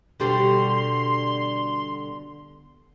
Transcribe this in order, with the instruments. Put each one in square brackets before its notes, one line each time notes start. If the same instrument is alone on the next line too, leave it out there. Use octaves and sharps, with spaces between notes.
[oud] B2 D3 G3 [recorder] C6